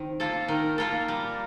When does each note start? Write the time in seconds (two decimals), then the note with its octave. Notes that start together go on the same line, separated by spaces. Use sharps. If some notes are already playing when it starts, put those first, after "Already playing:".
Already playing: D#3 C4
0.20 A#3 F4 A4
0.48 D#3 A#4
0.78 A#3 F4 A4 A#4
1.08 G3